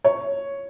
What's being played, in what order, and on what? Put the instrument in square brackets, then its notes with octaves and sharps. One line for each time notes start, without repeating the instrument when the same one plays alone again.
[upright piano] C#5